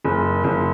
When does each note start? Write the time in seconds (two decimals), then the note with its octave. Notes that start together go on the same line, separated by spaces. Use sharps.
0.05 F#1
0.44 F#1